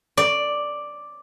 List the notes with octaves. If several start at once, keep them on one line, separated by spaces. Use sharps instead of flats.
D5